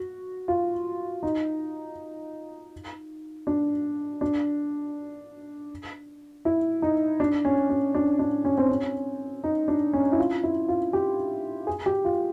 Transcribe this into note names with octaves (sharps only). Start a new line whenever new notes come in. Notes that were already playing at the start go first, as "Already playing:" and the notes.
Already playing: F#4
F4
D#4
D4
D4
E4
D#4
D4
C#4
C#4
D4
D4
C#4
C4
C#4
D#4
D4
C#4
E4
F4
E4
F4
G4
G#4
G4
F4